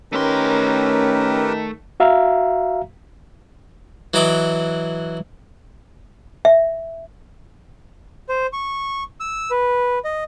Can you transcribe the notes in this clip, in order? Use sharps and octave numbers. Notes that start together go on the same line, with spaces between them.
D#3 A3 C#4 G4 A#4 B4 C6
F#4 E5 F5 A#5
E3 F#3 D#5 D6
E5
C5
C#6
E6
B4
D#5